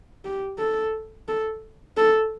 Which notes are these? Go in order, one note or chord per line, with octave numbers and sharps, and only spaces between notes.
G4
A4
A4
A4